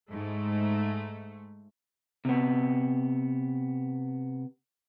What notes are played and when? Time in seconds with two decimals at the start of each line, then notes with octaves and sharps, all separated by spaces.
0.11 G#2 A3
2.25 C3 B3